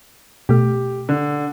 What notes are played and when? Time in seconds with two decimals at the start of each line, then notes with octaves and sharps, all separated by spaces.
0.49 B2 A3 G4
1.09 D3